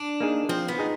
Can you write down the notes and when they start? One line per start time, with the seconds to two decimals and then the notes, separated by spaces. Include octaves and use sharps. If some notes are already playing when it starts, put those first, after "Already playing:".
Already playing: D4
0.20 A#3 D#4 G#4
0.49 F3 C4
0.68 B3
0.79 D#4 G#4